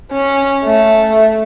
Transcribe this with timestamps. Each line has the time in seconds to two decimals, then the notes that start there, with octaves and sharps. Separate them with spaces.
0.12 C#4
0.64 A3